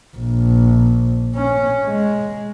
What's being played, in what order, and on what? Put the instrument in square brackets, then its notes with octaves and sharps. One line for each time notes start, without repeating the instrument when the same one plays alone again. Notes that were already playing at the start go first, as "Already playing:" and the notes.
[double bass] A#1
C#4
G#3